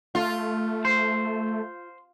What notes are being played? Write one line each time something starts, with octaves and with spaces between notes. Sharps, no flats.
A3 F4
C5